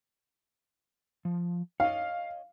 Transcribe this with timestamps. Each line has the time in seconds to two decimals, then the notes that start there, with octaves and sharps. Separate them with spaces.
1.25 F3
1.80 C#5 D#5 F5